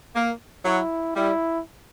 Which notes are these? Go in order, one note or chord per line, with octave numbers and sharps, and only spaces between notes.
A#3
F#3 E4
G3 E4